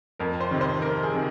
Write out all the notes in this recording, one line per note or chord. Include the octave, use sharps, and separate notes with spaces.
F2 A#4
C5
C3 D#3
C5
F2 A#4
G#4
C3 D#3